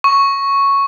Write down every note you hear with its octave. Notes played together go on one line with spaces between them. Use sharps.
C#6